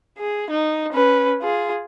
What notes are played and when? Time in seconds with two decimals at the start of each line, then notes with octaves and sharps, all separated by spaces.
0.18 G#4
0.50 D#4
0.93 C#4 B4
1.42 F4 G#4